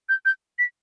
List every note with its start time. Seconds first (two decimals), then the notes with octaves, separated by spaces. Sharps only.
0.09 G6
0.25 G6
0.59 B6